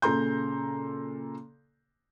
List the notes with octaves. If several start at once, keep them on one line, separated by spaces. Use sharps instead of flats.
A#2 C#3 A4 A#5 C6 G6